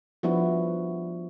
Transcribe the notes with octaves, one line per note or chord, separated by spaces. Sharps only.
F3 G3 B3 D4 E4 F#4